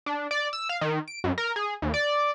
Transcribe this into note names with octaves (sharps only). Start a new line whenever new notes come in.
D4
D5
E6
F5
D#3
D7
F#2
A#4
G#4
D#2
D5